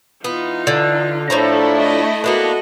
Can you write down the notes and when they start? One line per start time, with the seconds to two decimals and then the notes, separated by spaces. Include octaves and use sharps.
0.24 E3 B3 D#4 F4
0.67 D3
1.30 A2 F3 A3 D4 E4 A4 A#5
1.80 D#5
2.24 A#3 B3 D4 F#4 A4 D#5